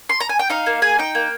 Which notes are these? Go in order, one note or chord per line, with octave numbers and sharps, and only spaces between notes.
C6
A#5
G#5
G5
D#4 F5
A#3
G#4 G#5
D#4 G5
A#3